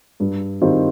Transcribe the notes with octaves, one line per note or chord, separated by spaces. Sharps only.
G2
D#3 G3 C4 F4